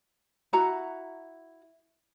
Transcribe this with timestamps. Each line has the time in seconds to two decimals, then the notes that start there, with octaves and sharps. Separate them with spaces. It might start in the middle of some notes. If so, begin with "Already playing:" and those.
0.53 E4 F#4 F#5 A#5